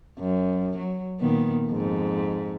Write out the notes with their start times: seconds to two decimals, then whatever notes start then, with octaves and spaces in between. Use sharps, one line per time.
0.19 F#2
0.77 F#3
1.20 A#2 D#3 B3
1.67 F2 G#2